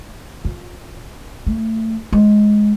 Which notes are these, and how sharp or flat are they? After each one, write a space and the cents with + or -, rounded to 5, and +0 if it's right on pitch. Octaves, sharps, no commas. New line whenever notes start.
F4 +20
A3 +20
G#3 +10